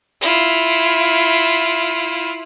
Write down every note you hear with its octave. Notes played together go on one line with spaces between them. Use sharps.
E4 F4